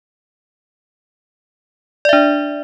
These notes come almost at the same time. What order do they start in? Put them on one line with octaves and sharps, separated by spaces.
D5 E5 D4